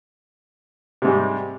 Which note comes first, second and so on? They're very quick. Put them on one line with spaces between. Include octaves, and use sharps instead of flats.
C3 G#2 G3